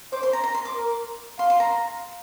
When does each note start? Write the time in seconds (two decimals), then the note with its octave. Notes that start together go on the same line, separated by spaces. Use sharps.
0.12 C5 D6
0.23 C6
0.33 A#5
0.44 A#5
0.55 C6
0.65 D6
0.75 A#4
1.39 F5 C6
1.50 C6
1.60 A#5